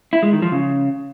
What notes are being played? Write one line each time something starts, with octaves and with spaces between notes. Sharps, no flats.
E4
G#3
D#3
F3
C#3